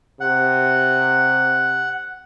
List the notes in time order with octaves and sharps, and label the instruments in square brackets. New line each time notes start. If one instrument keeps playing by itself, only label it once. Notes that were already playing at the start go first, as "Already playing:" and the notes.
[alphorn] C3 [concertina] F#5